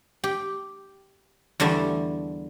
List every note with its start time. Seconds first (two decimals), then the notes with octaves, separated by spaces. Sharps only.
0.24 G4
1.60 E2 D3 G3 A3 E5